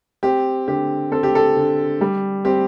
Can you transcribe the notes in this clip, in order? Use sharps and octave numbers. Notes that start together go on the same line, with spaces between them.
C4 G4
D3 G4
C4 A4
G4
A4
D3
G3
C4 G4